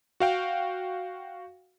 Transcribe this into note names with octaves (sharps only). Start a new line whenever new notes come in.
F#4 F5 G5